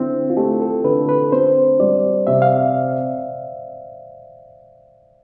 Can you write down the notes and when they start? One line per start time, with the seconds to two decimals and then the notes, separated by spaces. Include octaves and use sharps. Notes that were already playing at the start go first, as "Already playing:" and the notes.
Already playing: D3 C4 E4
0.30 F4
0.37 A3 G4
0.61 A4
0.84 D3 B4
1.09 B4
1.32 C4 C5
1.79 G3 D5
2.27 C3 E5
2.42 F5